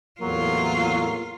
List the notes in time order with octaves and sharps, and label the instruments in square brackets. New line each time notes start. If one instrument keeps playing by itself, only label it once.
[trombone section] E2 A2 A#3 [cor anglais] F#3 [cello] F4